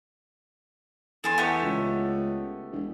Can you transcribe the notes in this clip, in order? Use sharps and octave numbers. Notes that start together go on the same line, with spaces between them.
E2 A4 G#5 C6
A3 B3 G4
C#2
E1